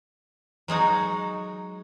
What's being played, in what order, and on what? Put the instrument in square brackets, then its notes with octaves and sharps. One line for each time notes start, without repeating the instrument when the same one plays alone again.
[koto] F#3 G#3 D#4 F#4